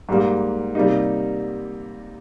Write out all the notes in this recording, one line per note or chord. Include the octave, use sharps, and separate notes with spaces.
G#2 G3 A#3
C3 G3 A#3 D#4